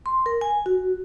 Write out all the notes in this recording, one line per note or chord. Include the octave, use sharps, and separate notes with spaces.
C6
A#4
G#5
F#4